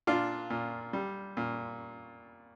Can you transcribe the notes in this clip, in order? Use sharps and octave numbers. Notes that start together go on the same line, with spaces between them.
A#2 D4 F4
A#2
G3
A#2